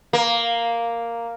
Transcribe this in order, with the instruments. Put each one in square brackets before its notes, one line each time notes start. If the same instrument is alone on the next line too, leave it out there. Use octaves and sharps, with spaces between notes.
[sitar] A#3